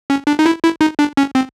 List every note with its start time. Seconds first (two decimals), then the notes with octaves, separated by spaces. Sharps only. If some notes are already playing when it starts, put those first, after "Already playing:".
0.10 C#4
0.27 D4
0.39 D#4
0.46 E4
0.63 E4
0.81 D#4
0.99 D4
1.17 C#4
1.35 C4